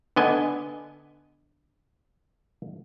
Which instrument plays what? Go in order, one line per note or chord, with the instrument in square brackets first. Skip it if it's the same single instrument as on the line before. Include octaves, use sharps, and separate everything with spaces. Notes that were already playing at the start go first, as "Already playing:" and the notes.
[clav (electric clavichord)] D3 B3 D#5 G#5